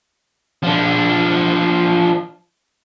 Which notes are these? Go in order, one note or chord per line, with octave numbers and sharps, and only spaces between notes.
F3 D4